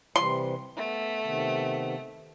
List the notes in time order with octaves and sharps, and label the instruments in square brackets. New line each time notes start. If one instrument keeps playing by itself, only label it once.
[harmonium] C3 E3 G3 [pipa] C6
[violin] A3 [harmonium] B3
[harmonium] C3 D#3 B3